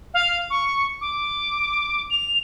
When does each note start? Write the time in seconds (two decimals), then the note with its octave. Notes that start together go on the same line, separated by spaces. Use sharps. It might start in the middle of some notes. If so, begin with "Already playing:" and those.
0.14 F5
0.50 C#6
1.01 D6
2.11 F7